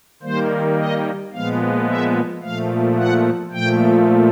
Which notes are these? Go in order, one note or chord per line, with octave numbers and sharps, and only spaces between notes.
D#3 G3 A#3 C5
D#5
A#2 F3 G#3 B3 F5
E5
A#2 F3 A3 F5
F#5
A#2 F3 A3 G5